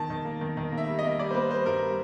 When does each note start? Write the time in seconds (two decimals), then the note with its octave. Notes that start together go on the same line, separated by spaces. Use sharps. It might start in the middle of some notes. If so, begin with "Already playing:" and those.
Already playing: D#3 A5
0.10 D#3
0.25 A#3
0.41 D#3
0.57 D#3
0.72 A#3
0.78 E5
0.87 G3
0.99 A#3 D#5
1.19 G3 D5
1.31 C5
1.34 A#3 B4
1.50 G3 C5
1.66 G2 A#4
1.82 G3